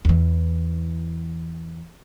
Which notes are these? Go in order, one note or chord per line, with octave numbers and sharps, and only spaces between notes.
E2 E3